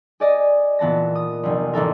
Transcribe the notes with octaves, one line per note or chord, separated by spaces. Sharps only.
G#4 D5 D#5
A#2 E3 B3 A5 A#6
D#6
F1 C2
A1 E3 A4 A#4